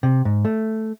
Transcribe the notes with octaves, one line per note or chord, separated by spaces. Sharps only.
C3
G#2
A3